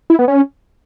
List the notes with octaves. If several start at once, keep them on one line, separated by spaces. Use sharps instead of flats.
E4
B3
C#4